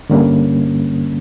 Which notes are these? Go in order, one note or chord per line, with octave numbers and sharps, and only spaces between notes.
G2 D3 G3 A#3 C#4